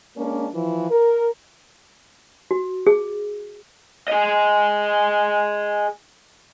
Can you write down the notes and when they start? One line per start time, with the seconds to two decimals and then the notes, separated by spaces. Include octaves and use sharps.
0.17 G#3 A#3 C#4 D4 A#4
0.54 E3 F3
0.90 A#4
2.51 F#4
2.87 G#4
4.08 G#4 D#5